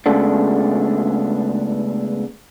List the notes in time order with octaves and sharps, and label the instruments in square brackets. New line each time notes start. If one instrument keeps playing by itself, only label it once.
[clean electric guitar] C#3 G#3 A3 B3 D4